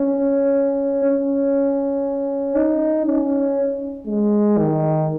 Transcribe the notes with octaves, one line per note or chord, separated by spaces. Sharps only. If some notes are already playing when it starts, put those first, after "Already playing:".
Already playing: C#4
C#4
D#4
C#4
G#3
D#3